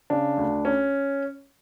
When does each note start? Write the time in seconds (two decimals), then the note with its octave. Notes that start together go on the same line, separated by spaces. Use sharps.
0.10 C#3 D4
0.37 D2
0.65 C#4